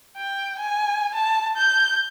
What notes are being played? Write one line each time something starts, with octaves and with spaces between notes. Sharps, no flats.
G5
G#5
A5
G6